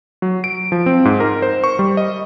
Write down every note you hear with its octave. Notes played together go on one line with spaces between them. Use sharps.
F#3
D7
F3
C4
G#2
A#4
C5
C#6
G3
D#5